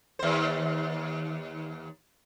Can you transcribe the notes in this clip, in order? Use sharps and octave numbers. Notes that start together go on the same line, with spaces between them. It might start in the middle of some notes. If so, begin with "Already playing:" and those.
D#2 C5